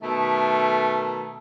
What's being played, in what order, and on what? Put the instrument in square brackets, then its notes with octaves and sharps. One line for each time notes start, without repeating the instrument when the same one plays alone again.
[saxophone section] B2 D#3 A3